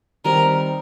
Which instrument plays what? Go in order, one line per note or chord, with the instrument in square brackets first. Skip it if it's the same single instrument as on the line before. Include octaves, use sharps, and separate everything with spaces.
[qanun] D#3 G3 C4 [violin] A#4